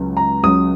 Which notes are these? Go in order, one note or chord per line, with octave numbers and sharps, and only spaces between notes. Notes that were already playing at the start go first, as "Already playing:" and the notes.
Already playing: C#2 C#3 F#3
A#5
C#2 C#3 F#3 D#6